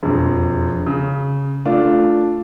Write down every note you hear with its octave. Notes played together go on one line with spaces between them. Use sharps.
E1 F2
C#3
A3 D4 F4